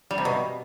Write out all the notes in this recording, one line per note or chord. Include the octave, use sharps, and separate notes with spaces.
G3
C3
B2